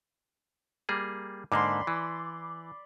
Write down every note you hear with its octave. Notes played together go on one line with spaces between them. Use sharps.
G3 A#3 G#4
G#2 D3 A#3 D5 B5 C6
E3